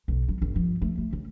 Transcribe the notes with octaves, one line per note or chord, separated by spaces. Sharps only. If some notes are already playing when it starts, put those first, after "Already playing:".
B1
F#3
G1
F3
A3
A3
C#3